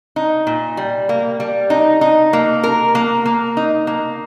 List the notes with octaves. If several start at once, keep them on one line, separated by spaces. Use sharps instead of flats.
D#4
A#2
G3
A#3
G3
D#4
D#4
A#3
A#4
A#3
A#3
D#4
A#3